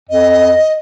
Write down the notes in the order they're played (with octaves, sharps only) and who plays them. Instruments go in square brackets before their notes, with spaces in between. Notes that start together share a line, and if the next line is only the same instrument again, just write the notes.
[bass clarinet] F2 [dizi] D#5